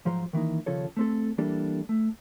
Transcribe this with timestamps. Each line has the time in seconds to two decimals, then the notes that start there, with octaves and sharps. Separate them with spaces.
0.05 G#2 F3 F#3 C5 A#5
0.33 D#3 E3 A#3 D#4
0.66 D#2 C#3 F3 A4 C#5
0.97 A3 C4 A4
1.38 E3 G3 A#3 D4 A4
1.89 A3